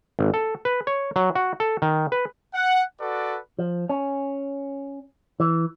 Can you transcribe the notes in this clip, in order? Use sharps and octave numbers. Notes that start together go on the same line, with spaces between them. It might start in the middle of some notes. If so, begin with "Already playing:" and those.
G#1
A4
B4
C#5
F#3
F#4
A4
D#3
B4
F#5
F#4 A4 B4 D5
F3
C#4
E3